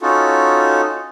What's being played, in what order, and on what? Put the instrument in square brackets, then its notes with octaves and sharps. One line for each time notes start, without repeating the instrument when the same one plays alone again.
[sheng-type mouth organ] C#4 D#4 F4 F#4 A4